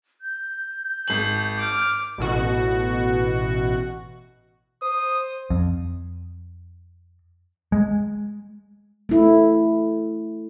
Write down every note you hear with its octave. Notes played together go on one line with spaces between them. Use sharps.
G6
G#1 F#7
D6 F6
A1 B2 F#4
C5 D#6
F2
G#3
A3 E4